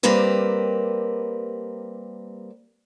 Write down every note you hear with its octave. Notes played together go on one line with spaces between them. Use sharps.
G3 A#3 C4 G4 A#4 B4